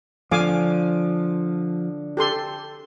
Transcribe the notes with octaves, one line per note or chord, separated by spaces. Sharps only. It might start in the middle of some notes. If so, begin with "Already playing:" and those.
D3 F3 F5 G#5 D6
G4 A4 C6